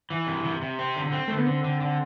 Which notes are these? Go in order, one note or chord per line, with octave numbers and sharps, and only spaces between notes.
E3
C3
C3
C3
C4
D3
C4
D3 A3
B3
D3 C4
D3
D3